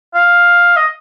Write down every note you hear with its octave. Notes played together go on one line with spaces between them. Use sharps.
F5
D#5